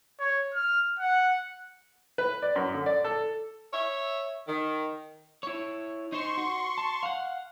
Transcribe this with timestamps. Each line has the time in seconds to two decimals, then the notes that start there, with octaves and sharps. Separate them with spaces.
0.20 C#5
0.54 F6
0.99 F#5
2.18 B4
2.42 D5
2.56 F#2
2.74 D3
2.86 D5
3.04 A4
3.73 C#5 E5
4.48 D#3
5.43 E4 C#5
6.12 D#4 C5 C6 C#6
6.38 F#4
6.78 A5
7.03 F5 F#5